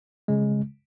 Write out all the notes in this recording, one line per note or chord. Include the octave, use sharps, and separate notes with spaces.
C#3 G#3